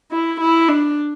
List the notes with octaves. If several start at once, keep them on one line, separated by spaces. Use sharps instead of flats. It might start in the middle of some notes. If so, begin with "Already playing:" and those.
E4
E4
D4